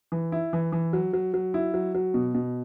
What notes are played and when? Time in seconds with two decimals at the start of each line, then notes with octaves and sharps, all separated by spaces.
0.12 E3
0.32 E4
0.53 E3
0.72 E3
0.93 F#3
1.13 F#3
1.34 F#3
1.54 E4
1.74 F#3
1.94 F#3
2.14 B2
2.34 B2